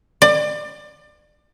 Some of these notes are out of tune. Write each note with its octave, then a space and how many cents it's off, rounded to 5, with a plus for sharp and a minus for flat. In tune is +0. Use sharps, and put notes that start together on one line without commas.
D5 +30